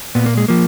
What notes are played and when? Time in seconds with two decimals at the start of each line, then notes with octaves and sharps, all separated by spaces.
0.15 A#2 B3
0.26 A#3
0.37 G#3
0.48 F3 A#3